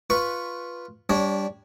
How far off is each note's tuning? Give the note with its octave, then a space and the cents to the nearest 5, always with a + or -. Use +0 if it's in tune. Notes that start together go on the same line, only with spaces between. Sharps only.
F4 +0 B4 -5 C#6 +0
G3 +0 D4 -25 C#5 -10